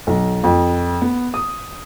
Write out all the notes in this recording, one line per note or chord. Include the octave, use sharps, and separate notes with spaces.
B1
F2
B3
D#6